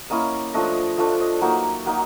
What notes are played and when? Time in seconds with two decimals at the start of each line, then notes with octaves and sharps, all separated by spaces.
0.10 A#3 C#4 E4 D#5
0.54 F3 A3 D4 D#5
0.98 F3 A3 D4 E5
1.20 D#5
1.41 F#3 A#3 D#4 E5
1.86 F#3 A#3 D#4